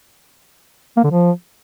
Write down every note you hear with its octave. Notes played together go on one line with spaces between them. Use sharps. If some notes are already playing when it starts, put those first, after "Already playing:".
A#3
D3
F3